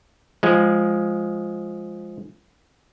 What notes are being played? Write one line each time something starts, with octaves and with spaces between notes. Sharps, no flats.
F3 G#3